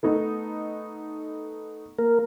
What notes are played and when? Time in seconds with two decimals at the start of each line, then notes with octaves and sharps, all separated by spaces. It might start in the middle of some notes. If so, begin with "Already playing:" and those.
0.03 A3 B3 D#4
1.98 A#3 A#4